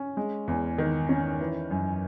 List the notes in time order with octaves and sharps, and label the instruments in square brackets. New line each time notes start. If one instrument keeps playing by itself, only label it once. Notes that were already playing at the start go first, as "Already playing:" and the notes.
Already playing: [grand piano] C#4
G#3
E2
D#3
C#4
E3
F#2